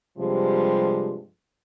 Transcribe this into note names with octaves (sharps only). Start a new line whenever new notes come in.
G2 C3 F3 G3 G#3